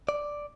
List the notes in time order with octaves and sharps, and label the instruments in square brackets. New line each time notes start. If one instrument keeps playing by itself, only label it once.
[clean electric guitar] D5